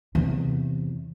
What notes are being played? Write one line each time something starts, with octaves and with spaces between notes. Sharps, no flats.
E2 C3